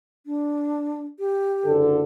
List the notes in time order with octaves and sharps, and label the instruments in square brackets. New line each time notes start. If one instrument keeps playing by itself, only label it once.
[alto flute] D4
G4
[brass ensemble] F#1 D3 A4